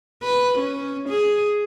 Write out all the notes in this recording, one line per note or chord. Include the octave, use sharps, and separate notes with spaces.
B4
C#4
G#4